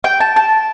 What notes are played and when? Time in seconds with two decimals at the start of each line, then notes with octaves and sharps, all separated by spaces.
0.04 G5
0.20 A5
0.36 A5